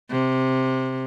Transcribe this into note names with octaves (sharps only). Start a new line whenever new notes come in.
C3